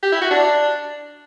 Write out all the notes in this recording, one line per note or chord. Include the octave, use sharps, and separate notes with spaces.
G4
E4
F#4
D4